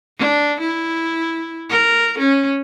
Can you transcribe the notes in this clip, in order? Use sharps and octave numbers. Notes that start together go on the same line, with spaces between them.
D4
E4
A#4
C#4